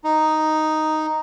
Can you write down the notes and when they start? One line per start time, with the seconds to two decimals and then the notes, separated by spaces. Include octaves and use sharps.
0.04 D#4